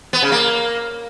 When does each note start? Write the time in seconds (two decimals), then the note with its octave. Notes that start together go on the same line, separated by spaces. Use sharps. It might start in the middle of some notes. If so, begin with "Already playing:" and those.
0.13 B3
0.22 C#3
0.32 A#3